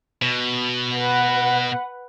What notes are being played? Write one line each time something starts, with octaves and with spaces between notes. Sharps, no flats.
B2
B4 F#5